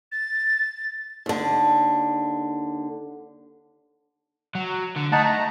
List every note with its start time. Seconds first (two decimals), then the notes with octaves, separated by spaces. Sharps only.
0.12 A6
1.26 D#2 D3
4.55 F#3
4.97 D3
5.12 A3 D#4 F#5 A5
5.25 A#5